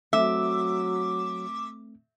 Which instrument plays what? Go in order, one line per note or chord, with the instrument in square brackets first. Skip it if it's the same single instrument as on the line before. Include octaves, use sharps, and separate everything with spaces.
[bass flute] F#3 [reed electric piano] A3 C4 [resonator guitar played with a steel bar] E5 [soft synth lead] D6